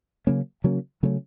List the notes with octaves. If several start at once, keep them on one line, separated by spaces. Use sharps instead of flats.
C#3 F#3 A#3 C#4
C#3 F#3 A#3 C#4
C#3 F#3 A3 C#4